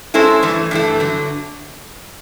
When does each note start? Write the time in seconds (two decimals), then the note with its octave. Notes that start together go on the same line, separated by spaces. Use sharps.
0.14 G#3 C#4 E4 A4 C5
0.42 G2 E3 A3
0.71 G2 E3 A3
1.00 D3 F#3